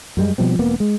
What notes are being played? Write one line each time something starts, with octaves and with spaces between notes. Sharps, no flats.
F#2 G3 G#3
B2 F3 G3 C4
E1 A#3 B3
G#3